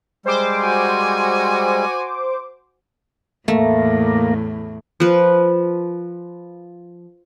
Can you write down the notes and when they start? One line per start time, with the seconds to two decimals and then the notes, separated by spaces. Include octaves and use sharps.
0.26 G3 G#3 C5 D6
0.61 F#4 G#5
3.48 E2 A2 A3 A#3
5.00 F3 B4